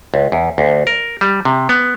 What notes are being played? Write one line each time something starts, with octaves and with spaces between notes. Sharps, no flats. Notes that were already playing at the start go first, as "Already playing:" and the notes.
C#2
E2
D2
A#4
G3
C3
B3